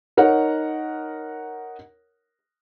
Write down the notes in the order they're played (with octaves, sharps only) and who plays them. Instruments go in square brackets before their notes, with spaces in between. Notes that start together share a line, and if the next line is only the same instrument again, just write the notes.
[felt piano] D#4 A#4 C#5 F#5